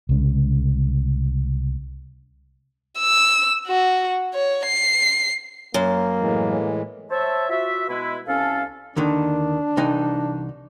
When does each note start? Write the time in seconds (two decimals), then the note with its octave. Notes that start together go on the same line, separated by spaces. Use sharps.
0.09 C2 C#3 G#3
3.00 E6
3.67 F#4
4.34 C#5
4.65 C7
5.74 F#2 A#3
6.18 A2 E3 G#3
7.11 C5 C#5 E5 A5
7.50 F4 F#4 E5
7.88 B2 G#3 E4 B4
8.27 C2 C#4 A4 F5
8.97 D#2 D3 D#3 D4
9.77 C2 E3 D#4